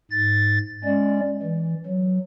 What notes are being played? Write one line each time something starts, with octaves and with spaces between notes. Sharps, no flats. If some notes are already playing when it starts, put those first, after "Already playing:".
G#2 A6
G#3 C#4 D5
E3
F#3